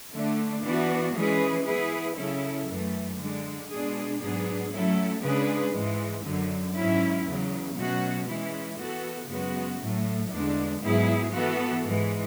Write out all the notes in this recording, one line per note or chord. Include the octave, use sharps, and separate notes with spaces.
D3 A3 D4
E3 B3 D4 F#4
E3 G#3 C#4 G#4 B4
E3 B3 E4 G#4 B4
C#3 F#3 C#4 E4 A4
F#2 E3 A3
D3 G#3 D4
B2 G#3 D4 G#4
G#2 F#3 B3 D4 G#4
F#3 A3 C#4 E4 A4
C#3 G#3 D4 G#4 B4
G#2 E3 G#3
F#2 D3 F#3
G#2 F#3 C#4 E4
E2 C#3 F#3
B2 F#3 A3 C#4 F#4
E3 G#3 C#4 E4
E3 B3 F#4 A4
F#2 C#3 G#3 B3 F#4
A2 F#3 A3
E2 D3 G#3 D4
G#2 F#3 B3 E4 G#4
E3 B3 F#4 A4
G#2 E3 G#3